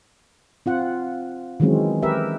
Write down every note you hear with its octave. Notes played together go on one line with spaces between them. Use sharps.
C4 F4 F#5
D#3 E3 F#3 G#3 C4 C#4
G4 A#4 B4 E5